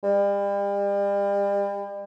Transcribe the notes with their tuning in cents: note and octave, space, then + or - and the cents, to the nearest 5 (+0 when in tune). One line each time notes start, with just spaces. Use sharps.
G3 +40